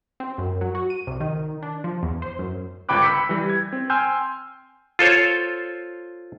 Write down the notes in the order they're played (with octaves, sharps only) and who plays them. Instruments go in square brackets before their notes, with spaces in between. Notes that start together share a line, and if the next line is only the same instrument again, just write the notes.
[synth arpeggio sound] C4
F#2
F#3
F#4
D#7
C2
D#3
D4
F3
E2
C5
F#2
[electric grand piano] G1 C#2 G5 B5 D6 F#6
B5 E6 G6 B6 C#7
E3 G3
G#6
C4
G5 G#5 C6 E6 F6 G6
[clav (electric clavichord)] F4 A4 C5 C#5